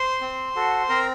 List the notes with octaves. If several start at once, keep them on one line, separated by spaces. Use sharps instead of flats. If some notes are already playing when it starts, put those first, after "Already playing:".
Already playing: C5 C6
C4
F#4 A4
C4 A#4 A#5